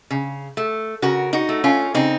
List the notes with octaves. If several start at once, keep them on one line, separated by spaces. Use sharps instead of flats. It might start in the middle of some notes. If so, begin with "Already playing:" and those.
C#3
A3
C#3 F#4 A#4
D#4 F#4
A3
C#4 F4
C#3 C4 D#4